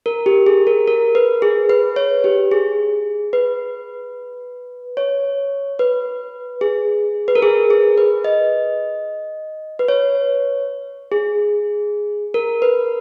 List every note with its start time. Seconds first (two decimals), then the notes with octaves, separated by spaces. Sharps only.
0.06 A#4
0.26 G4
0.46 G#4
0.67 A#4
0.88 A#4
1.15 B4
1.42 G#4
1.70 B4
1.96 C#5
2.24 G4
2.51 G#4
3.33 B4
4.97 C#5
5.79 B4
6.61 G#4
7.28 B4
7.35 A#4
7.42 G#4
7.70 G#4
7.98 B4
8.24 D#5
9.79 B4
9.88 C#5
11.12 G#4
12.34 A#4
12.62 B4